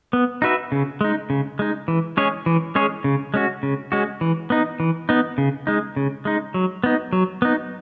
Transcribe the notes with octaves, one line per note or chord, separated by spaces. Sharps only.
B3
D#4 F#4 B4 E5
C#3
G#3 D#4
C#3
G#3 D#4
E3
G#3 C#4 G#4 C#5
E3
G#3 C#4 G#4 C#5
C#3
G#3 C#4 F#4
C#3
G#3 C#4 F#4
E3
B3 D#4
E3
B3 D#4
C#3
G#3 D#4
C#3
G#3 D#4
F#3
B3 D#4
F#3
B3 D#4